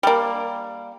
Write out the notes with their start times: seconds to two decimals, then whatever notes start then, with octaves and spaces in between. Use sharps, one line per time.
0.03 G3 A#3